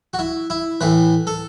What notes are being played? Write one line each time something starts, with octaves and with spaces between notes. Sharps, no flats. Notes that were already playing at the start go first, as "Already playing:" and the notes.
F#4
E4
E4
A2 E3 B4
A4